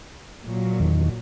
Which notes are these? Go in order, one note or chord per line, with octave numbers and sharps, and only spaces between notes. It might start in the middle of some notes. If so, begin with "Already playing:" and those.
A#2 F#3
E2 D#3